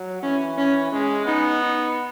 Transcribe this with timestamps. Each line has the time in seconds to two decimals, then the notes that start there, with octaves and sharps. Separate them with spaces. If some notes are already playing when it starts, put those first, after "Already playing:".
Already playing: F#3
0.23 E3 C#4
0.58 C#4
0.92 G#3 C#4
1.26 B3 D#4
1.61 D#4